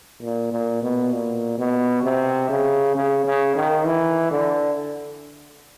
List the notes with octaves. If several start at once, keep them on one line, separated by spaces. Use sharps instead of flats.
A#2
A#2
B2
A#2
B2
C3
C#3
C#3
C#3
D#3
E3
D3